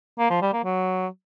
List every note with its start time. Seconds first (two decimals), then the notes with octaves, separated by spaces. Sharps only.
0.19 A#3
0.30 F3
0.42 G3
0.53 A#3
0.64 F#3